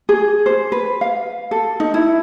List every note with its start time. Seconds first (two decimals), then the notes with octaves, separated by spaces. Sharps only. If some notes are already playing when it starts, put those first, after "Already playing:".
0.09 G#4
0.46 C5
0.72 B4
1.01 F5
1.51 A4
1.80 D#4
1.94 E4